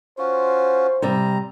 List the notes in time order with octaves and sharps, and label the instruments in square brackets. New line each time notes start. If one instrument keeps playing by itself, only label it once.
[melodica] C#4 F4 F#4 [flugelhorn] C5
[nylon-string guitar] C3 G3 [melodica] A#5